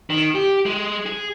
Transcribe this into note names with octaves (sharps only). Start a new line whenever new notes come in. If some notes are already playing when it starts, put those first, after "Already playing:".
D#3
G4
G#3
G#4